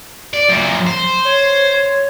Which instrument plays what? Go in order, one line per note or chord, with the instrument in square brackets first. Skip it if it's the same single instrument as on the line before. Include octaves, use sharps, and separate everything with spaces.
[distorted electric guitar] D5
F#2 A#2
C5
[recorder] C#5